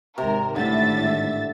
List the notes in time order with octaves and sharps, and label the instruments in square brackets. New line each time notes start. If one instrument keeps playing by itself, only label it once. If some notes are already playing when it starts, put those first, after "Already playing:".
[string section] G#1 A#4 [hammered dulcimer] C3
[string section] G#1 E5 A6 [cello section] A2 [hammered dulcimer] D3